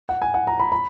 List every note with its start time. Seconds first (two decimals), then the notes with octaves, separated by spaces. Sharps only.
0.09 F#5
0.22 G#5
0.34 F#5
0.47 A#5
0.60 B5
0.72 B5